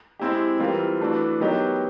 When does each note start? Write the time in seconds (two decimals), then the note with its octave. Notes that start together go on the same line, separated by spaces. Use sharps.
0.20 G#3 C4 E4 G4
0.59 E3 G3 C4 F4 A#4
1.01 E3 A3 D4 F#4
1.40 D#3 F#3 B3 D#4 G4